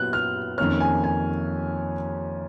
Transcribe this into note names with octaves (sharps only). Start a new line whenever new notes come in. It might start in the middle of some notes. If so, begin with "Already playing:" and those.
Already playing: A#2 F#3 B3 F#6
F6
F2 D#3 A#3 C#4 F6
G#5
G#5